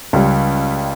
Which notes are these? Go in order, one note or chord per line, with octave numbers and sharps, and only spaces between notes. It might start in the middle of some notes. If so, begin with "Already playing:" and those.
C#2 G3